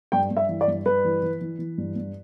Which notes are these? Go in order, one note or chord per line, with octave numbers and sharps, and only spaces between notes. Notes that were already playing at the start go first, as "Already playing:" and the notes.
G2 G5
G2
E5
E3
D5
G2
G2 B4
E3
E3
E3
E3
G2
G2